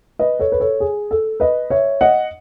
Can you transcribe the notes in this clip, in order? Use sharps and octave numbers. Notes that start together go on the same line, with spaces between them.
B4 D#5
A4 C#5
B4
A4 C#5
G#4
A4
B4 D#5
C#5 E5
D#5 F#5